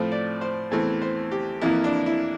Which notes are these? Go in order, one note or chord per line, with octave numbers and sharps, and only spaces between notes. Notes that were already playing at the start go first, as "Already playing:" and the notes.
Already playing: A2 F3 A3 C4 C5
D5
C5
E2 E3 A3 C4
C5
G4
F2 E3 A#3 E4
D4
E4